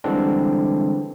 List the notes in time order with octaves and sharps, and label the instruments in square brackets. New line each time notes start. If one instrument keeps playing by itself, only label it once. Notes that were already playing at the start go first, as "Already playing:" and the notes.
[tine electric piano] D3 E3 G3 G#3 C4 D4